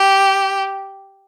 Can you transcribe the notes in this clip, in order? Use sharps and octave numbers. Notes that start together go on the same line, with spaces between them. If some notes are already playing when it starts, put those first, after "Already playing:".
Already playing: G4